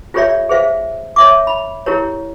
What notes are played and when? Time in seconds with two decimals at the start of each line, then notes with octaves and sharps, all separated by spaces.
0.14 F4 G4 A4 C#5 D5 E5
0.49 G#4 C5 E5 F5
1.16 C#5 E5 D6
1.47 B5
1.86 E4 G4 A#4 C#5